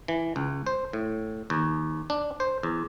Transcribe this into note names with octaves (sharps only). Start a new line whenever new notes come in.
E3
C#2
C5
A2
D#2
D4
C5
E2